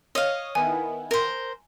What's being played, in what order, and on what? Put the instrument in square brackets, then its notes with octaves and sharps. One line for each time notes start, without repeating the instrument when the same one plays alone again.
[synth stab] C#5 D#6 [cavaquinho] D#5 F5
[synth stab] D#3 B3 E4 [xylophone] G#5
[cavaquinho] A#4 C5